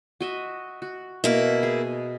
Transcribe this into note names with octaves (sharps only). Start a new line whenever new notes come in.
F#4 D#5 E5
F#4
B2 A#3 E4 A#4
G#4